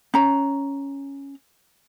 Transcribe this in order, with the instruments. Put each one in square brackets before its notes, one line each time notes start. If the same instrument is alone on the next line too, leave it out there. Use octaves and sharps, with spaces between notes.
[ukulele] C#4 A#5